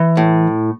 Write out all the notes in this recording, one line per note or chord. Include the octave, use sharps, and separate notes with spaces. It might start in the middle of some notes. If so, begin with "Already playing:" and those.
Already playing: E3
A2